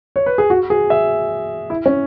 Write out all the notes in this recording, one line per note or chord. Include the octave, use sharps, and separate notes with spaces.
C#5
B4
G#4
F#4
G#4
E5
E4
C#4